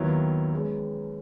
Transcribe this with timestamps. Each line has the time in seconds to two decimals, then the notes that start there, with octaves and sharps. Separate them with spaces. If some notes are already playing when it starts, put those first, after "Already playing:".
Already playing: D#2 D#3 F#3 B3 E4
0.52 E3 G#3 C#4